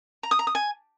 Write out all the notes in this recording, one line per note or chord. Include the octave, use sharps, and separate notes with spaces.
A#5
D#6
A#5
D#6
G#5